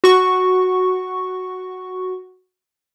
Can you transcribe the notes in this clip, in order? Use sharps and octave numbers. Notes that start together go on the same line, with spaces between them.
F#4 C#6